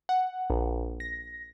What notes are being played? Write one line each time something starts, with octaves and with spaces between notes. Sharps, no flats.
F#5
A#1
A#6